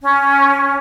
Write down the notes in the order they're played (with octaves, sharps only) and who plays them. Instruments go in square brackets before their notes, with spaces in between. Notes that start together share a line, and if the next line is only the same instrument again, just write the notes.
[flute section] C#4